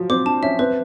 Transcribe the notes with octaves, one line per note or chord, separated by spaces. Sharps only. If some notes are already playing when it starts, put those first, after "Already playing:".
Already playing: F3 F#3
C4 D6
D4 A5
C#4 E5
C4 B4